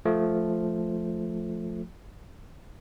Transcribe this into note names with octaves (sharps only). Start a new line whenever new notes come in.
F3 A3